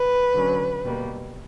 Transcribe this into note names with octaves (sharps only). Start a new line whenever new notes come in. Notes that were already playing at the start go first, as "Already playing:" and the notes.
Already playing: B4
D3 F#3 C#4
B2 G3 A#3